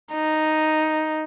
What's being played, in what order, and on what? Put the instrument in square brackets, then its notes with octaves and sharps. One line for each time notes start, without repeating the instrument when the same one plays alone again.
[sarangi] D#4